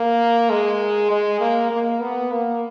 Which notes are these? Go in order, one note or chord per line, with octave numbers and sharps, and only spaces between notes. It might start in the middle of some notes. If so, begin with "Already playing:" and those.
Already playing: A#3
G#3
G#3
A#3
A#3
B3
A#3